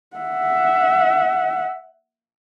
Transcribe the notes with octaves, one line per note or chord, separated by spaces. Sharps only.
E5 F#5